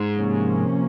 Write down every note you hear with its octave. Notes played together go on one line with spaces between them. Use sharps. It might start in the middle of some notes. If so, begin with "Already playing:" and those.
Already playing: G#2
C3 F3 A#3 C#4